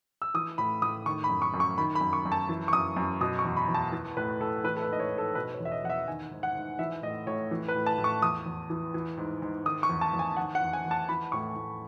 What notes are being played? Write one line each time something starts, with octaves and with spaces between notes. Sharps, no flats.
E6
E3 D#6
A2 B5
A2 D#6
D#3 C#6
B5
F#2
C#6
F#2
C#6
D#3 B5
B5
F#2
C#6
F#2
A5
E3
C#6
F#2 D#6
F#2
B2 D#6
C#6
E2
B5
E2
A5
E3
A2 B4
A2 A4
E3 B4
A4
B4
G#2 D#5
C#5
G#2
A4
B2 B4
C#5
E2
E5
D#5
E2 F#5
E5
D#3 G#5
G#2
F#5
G#2
E3 E5
A2 D#5
A2 C#5
E3
B4
A2
A5
A2
C#6
E2 D#6
E2
E3
E3
G#2
G#2
D#3 D#6
C#6
E2
A5
E2
G#5
D#3 F#5
F#5
E2
G#5
E2
A5
E3 B5
A2 C#6
A2